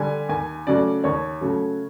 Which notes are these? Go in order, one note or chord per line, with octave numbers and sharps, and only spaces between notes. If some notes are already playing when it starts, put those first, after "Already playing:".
Already playing: D3 G3 G#5
D#2 G#5
C#3 F#3 A3 D5
D#2 C#5
C#3 F#3 A3